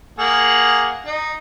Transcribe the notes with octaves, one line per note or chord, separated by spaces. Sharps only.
A#3 G#4 F#5
D#4